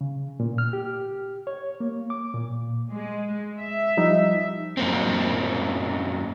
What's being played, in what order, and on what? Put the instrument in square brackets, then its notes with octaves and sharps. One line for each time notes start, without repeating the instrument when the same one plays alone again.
[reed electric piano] C#3
A#2
F6
G4
C#5
A#3
D6
A#2
[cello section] G#3
E5
[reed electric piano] F3 G3 D#4
[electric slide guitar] F#2 A#3 C4